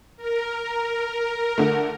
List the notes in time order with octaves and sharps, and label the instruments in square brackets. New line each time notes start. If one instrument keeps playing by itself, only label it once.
[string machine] A#4
[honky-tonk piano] D3 A3